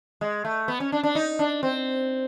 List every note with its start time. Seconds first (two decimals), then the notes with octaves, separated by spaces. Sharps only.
0.21 G#3
0.45 A3
0.68 B3
0.80 C#4
0.92 D4
1.03 D4
1.15 D#4
1.39 D4
1.63 C4